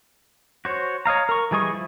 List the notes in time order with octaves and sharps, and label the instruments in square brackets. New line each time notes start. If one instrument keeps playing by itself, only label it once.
[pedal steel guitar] F#4 C5 C#5
C#5 D#5 F5 A#5
A#4 C#6
E3 G3 G#4 D#5 C#6
F3 E4